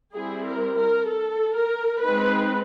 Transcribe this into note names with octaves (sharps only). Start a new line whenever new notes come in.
G3 C4 E4 G#4
A#4
A#4
A4
A#4
G#3 C4 D#4 B4